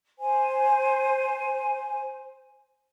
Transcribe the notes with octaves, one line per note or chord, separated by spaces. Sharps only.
C5 G#5